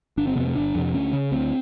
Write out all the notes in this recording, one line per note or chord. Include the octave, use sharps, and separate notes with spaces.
G1 D4
C4
F2 C3 B3
A3
G1 D4
F2 C3
D2 C#4
C#3
D2 C4